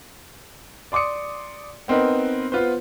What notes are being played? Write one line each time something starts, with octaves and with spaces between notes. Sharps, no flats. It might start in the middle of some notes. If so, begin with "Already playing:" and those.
D5 C6 D6 D#6 C#7
B3 C4 D#4 A#4 B4
B3 F4 B4 C5